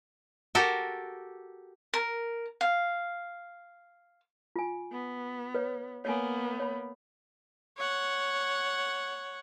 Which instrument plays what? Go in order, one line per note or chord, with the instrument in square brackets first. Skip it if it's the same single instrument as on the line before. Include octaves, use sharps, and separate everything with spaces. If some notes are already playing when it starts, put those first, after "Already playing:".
[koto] F#4 G4 A4 A#4
[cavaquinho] A#4
F5
[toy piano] F4 G#5
[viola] B3
[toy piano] B4 C#5
[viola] A#3 B3 [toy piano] C#5 G#5
[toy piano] C#5 B5
[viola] C#5 F#5